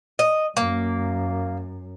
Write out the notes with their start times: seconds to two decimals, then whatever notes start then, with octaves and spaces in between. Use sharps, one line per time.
0.19 D#5
0.57 F#2 A#3